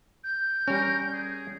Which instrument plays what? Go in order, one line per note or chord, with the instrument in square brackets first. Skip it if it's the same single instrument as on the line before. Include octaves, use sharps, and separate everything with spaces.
[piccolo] G6
[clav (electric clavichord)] G3 C#4 [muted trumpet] A#4
[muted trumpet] G#4